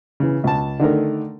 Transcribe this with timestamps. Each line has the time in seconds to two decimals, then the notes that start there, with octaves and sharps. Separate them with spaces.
0.20 C#3 E3
0.44 C#2 A5
0.79 D3 D#3 A3 A#4